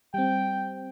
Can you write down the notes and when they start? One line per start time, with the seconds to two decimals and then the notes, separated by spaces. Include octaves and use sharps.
0.14 G3 C4 G5